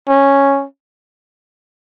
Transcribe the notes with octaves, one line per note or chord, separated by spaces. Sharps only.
C#4